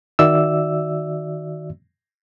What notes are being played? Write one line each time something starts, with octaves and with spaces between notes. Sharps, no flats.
D#3 F#4 D5 E5 E6